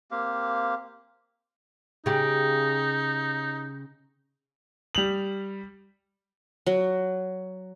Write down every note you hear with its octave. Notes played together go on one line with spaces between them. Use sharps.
A#3 C4 G4 F5
C#3 D#4 G4
G3 F7 F#7
F#3